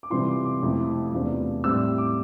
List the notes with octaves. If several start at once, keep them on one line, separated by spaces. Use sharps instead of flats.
D6
C3 E3 G3 C4 F4 C6
D6
D6
F2 C3 F3 A3 E4
E2 C3 F3 A3 D4
A2 G3 C4 E6
D6